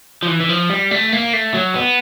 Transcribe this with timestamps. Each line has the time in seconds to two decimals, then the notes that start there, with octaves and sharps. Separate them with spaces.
0.23 F3
0.28 E3
0.40 E3
0.49 F3
0.70 G3
0.91 A3
1.12 A#3
1.33 A3
1.54 F#3
1.75 B3